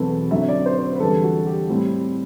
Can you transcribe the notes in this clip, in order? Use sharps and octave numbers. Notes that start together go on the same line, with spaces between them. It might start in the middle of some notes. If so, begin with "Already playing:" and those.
Already playing: E2 B2 F#3 C4 E4 A4 B4
F#2 D3 F#3 C4 E5
D5
C5
C5
B4
B4
E2 D3 G3 A4
F#4
G4
A2 G3 C4 E4